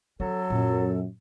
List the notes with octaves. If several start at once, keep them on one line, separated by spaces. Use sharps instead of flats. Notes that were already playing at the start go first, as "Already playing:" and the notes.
F#3 C#4 A4
F#2 A#2